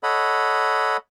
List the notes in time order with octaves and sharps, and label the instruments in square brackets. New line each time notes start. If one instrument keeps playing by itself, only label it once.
[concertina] A4 C#5 D#5 F#5 B5